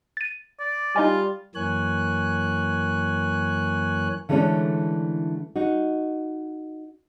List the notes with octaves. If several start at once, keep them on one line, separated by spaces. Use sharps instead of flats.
A6 D#7
D5
G3 D#4 F4 D#5 G#5
F#2 E3 A#3 C#5 G#5 F#6
D3 E3 G#3 A3 C#4 D4
D#4 F#4